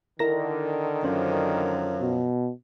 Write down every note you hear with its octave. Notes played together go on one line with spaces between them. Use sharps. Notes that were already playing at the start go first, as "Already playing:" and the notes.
D3 D#3 E4 A#4 A#6
F#2 F3 F#3 C#4 C5
B2